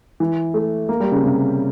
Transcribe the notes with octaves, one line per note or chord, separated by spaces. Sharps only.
E3
A3
A#3
G3
C#3
C3